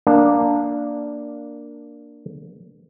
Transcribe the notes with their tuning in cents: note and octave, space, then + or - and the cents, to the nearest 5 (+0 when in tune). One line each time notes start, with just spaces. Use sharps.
A#3 +0 D4 +0